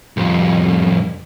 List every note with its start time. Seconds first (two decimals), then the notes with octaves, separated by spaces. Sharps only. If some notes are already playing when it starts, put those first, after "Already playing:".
0.17 C2 F2